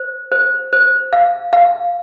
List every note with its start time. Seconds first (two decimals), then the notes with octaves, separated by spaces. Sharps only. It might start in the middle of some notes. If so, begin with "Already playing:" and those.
Already playing: C5
0.32 C5
0.73 C5
1.13 F5
1.53 F5